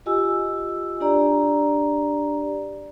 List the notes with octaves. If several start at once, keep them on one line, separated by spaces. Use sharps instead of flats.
F4 G4 D#5 G#5 E6
D4 G4 D5 A#5